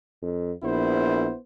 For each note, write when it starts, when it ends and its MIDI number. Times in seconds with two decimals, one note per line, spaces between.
0.22 0.53 41
0.63 1.27 34
0.63 1.35 59
0.63 1.35 64
0.63 1.35 72